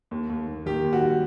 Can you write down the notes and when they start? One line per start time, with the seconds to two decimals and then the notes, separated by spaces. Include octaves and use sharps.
0.11 D#2
0.30 D#2
0.47 D#2
0.66 D#3 G4
0.84 D#2
0.93 F#4
1.02 G3